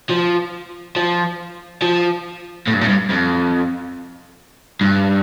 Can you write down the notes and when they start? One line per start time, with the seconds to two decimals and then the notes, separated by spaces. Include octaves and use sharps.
0.10 F3
0.96 F3
1.82 F3
2.67 A2
2.74 G2
2.81 A2
2.88 G2
3.09 F2
4.81 G2